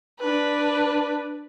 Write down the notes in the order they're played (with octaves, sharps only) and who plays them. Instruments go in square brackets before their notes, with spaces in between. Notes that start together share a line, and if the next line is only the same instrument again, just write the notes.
[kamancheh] D4 B4